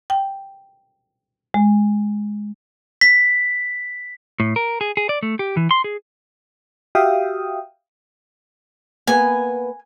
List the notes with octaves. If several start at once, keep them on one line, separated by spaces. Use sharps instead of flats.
G5
G#3
B6
A2
A#4
G#4
G#4
D5
A3
G4
E3
C6
G#4
F#4 G4 E5 F5 G5 D#6
A#3 B3 G#5